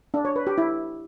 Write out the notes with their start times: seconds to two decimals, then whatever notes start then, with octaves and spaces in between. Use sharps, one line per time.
0.14 D4
0.25 C#5
0.36 B4
0.47 G4
0.58 E4